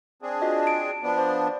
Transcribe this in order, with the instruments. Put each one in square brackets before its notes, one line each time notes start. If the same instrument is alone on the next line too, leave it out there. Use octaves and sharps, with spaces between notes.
[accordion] C4 D4 G#4
[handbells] F4 F#4 D#5
A5 D7
[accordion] F3 B3 D4
[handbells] C5 D5